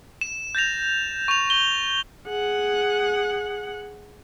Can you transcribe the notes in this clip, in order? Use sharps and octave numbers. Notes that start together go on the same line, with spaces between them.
E7
G6 A6 A#6 F7
C#6 F7
G7
G#4 F#5